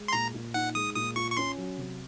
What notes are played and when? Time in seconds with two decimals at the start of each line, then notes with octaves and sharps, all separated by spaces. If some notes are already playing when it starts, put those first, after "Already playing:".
Already playing: G#3
0.08 C6
0.13 A#2 A#5
0.34 A#2
0.54 D#4 F#5
0.75 G#3 D#6
0.95 A#2 D#6
1.16 F4 C#6
1.32 C#6
1.37 C#4 C6
1.57 F#3
1.78 C3